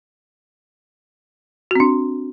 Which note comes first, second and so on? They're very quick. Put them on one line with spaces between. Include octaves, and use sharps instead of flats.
F#4 C4 D4